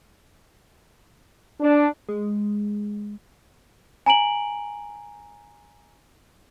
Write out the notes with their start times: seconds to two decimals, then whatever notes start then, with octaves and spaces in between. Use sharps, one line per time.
1.60 D4
2.09 G#3
4.06 G#5 A#5 D7 F#7